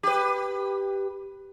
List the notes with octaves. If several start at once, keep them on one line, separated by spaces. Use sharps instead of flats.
G4 B4